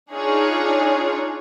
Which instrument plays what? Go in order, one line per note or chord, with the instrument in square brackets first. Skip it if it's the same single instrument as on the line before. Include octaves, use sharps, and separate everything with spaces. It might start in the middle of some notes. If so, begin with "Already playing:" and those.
[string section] D4 D#4 F4 G#4 C#5